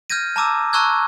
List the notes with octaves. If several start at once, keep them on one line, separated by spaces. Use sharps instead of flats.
F6 G6 G#6 A#6 D#7
A5 A#5 D6 E6
A5 A#5 C#6 E6 F#6 G#6